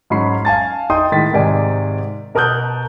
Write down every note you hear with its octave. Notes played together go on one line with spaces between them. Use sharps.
G#2 F#3 C#4 B5 C6 C7
F5 G#5 A5 A6
D#4 D#5 G5 C6 D#6
A2 D#3 G#3 A6 B6
G#2 C3 D#3 D5 G#5
B2 A#4 A5 D#6 F#6 G6